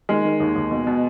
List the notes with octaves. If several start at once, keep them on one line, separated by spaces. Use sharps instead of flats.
D#3 G#3
D#3
D#2
D#2
B2
B2